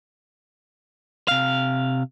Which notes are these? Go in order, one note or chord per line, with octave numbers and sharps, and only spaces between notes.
C3 F5